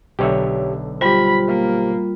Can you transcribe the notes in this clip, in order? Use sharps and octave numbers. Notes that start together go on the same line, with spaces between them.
B1 D3 G4 C#5 E5
G3 F4 G4 C5 B5
A#3